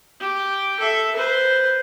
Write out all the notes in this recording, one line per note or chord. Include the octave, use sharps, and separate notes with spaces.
G4
A4 E5
B4 C5